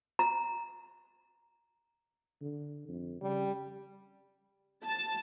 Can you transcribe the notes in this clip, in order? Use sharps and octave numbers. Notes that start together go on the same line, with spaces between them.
A#5
D3
F2
C#3 G3
A5